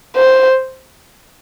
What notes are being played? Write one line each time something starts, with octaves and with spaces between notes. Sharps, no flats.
C5